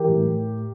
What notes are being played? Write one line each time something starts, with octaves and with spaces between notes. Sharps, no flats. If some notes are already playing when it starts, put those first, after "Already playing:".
Already playing: E3 G4 A#4
A2
A2